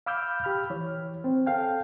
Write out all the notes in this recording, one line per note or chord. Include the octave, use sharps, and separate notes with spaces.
F5 B5 D6 E6 F6 G6
G4 B5 F6
E3 C#5
C4
A4 F5 G5